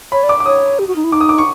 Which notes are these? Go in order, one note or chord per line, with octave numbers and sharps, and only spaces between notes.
C#5 B5
D5
D6
D6
C#5 D#6
G4
F#4
D#4
E4
D#4 D6
D#6
D6
C#6